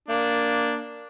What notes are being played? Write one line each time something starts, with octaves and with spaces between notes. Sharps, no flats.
A#3 D4